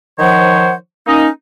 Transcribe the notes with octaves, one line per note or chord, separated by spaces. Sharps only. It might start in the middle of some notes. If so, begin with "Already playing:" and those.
D#3 F3 C5 C#5 F#5
A#3 C#4 D#4